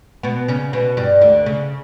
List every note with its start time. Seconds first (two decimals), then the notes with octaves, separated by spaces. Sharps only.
0.23 B2 B3
0.48 C#3 C#4
0.73 B2 B3
0.97 G2 G3
1.21 D2 D3
1.46 C#3